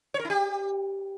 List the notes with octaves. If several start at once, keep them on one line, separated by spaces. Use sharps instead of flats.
C#5
A#4
E4
G4